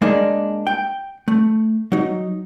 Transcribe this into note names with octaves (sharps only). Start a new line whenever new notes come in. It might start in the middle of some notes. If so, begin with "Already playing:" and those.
G#3 A#3 D4 D#4
G5
A3
F#3 D#4